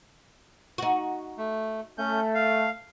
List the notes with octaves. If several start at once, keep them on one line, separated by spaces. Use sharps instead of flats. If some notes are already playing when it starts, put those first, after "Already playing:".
D#4 F#4
A3
A3 C#4 G6
F5